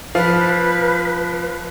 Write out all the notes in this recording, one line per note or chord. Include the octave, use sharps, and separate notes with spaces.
F3 B4 F5